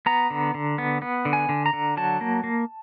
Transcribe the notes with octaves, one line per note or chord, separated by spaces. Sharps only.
B3 A#5
D3
D3
B3
B3
D3
G#5
D3
A#5
D3
F#3 A5
A#3
A#3